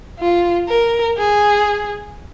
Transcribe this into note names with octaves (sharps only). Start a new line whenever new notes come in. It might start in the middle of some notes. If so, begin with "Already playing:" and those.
F4
A#4
G#4